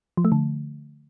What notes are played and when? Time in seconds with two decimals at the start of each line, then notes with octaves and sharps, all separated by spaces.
0.17 F3
0.25 A3
0.32 D3